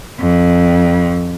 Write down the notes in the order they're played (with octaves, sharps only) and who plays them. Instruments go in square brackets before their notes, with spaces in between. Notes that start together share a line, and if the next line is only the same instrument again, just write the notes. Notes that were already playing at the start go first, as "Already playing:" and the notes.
[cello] F2